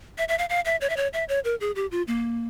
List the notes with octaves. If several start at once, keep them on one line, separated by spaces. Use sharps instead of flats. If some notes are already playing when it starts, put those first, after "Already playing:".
E5
E5
F5
F5
E5
C#5
E5
C#5
E5
C#5
A#4
G#4
G4
F4
A#3